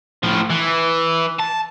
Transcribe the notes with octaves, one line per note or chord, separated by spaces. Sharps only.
A2 F3
E3
A5